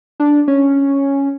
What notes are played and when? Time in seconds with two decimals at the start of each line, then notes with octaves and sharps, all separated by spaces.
0.20 D4
0.48 C#4